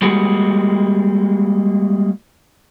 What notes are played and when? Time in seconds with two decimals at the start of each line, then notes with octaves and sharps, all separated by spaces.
0.02 G3 G#3 A#3 F#4